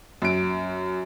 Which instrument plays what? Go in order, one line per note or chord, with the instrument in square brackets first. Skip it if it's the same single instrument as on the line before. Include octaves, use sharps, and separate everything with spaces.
[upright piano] F#2 D7